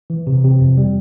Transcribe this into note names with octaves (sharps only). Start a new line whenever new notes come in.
E3
C3
C3
F2
G3